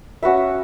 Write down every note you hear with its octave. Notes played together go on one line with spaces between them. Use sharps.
C#4 F#4 B4 E5